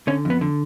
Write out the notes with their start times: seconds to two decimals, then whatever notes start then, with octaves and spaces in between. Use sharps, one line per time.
0.07 D3 C#4
0.25 F2 B3
0.41 D3